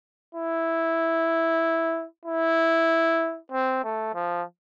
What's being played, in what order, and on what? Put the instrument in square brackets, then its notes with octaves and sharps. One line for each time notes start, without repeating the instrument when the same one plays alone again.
[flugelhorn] E4
E4
C4
A3
F3